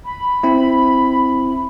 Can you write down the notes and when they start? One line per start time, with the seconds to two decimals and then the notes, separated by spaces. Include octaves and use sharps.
0.05 B5
0.43 C4 E4